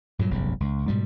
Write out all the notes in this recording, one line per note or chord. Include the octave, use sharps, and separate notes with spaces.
G2 A#2 F#3
F1 B1 G2 C#3
C#2
G#2 B2 G3